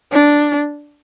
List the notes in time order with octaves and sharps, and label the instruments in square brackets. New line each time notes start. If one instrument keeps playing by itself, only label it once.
[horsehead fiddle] D4